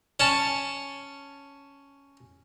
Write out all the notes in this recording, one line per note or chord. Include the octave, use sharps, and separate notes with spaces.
C#4 A5